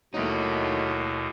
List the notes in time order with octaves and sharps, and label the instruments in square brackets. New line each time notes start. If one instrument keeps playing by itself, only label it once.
[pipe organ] D#2 B2 [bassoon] F#3 [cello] A3 E4 [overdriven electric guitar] A#3 D#4